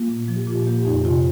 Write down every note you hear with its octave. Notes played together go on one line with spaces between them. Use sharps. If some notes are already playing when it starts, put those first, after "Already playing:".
Already playing: A#3 F4
A#2
F3
G4
A#2 F4
A#3 G4
F2 D#4
C3 F4